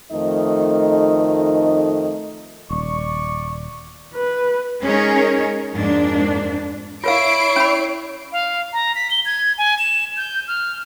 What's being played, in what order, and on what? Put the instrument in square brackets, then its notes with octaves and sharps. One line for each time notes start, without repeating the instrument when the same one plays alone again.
[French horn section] F2 D#3 A3 D#4 D#5
[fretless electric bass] D#1 [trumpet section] D5 C#6
[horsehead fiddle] B4
[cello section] G#3 C#4 D#4 G#4 A#4 C#5
F2 G#2 A#3 D4
[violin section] E4 C7 D7 [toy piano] F4 A#4 F5 [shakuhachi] C#5
[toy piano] C#4 B5
[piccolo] F5
A#5
B6
G7
G#6
G#5
E7
G6
F6